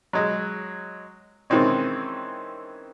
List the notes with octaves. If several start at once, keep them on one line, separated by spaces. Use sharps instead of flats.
F#3 G#3
D#3 E3 G#3 C4 C#4